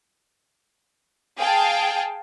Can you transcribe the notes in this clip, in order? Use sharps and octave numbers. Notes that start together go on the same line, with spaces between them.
G#4 F5 G5 A5